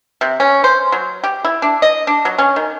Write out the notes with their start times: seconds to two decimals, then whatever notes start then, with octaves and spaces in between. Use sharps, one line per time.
0.21 C3
0.40 C#4
0.64 C5
0.92 F#3
1.24 G4
1.44 E4
1.62 D4
1.82 D#5
2.07 D4
2.25 F#3
2.38 C#4
2.56 D#3